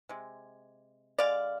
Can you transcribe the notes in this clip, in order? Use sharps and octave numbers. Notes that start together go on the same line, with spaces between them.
C3 G#3
D3 G#3 D5 F5